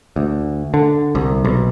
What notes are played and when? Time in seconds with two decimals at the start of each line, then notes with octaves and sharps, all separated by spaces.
0.16 D2
0.74 D3
1.15 C2
1.45 B1